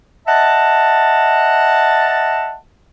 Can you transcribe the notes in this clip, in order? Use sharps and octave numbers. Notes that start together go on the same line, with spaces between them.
D#5 E5 F#5 A5